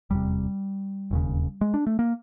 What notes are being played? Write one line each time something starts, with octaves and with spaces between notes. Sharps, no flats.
F1 E2 C3 G3
E1 D#2 C#3
G#3
D4
A3
A#3